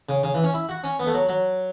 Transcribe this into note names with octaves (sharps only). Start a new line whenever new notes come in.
C#3
C#3
E3
C#4
E4
F#4
C#4
B3
A3
F#3
F#3